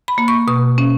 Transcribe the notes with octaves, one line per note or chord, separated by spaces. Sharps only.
B5
A#3
C#6
B2 C#6
C#4